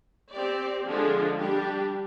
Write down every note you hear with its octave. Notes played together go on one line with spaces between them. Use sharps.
C4 G4 D5
D3 F3 G#3 D4
G3 D4 G4